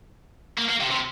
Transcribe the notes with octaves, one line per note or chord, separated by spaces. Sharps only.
A#3
A#3
C3
C3